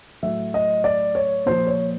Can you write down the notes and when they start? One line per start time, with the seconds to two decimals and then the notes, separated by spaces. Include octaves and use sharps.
0.23 A2 F#3 E5
0.54 D#5
0.84 D5
1.15 C#5
1.46 A#2 F3 C5
1.67 C#5